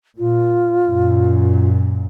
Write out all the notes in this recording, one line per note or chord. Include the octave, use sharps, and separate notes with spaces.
A#2 F4
F#2 A#2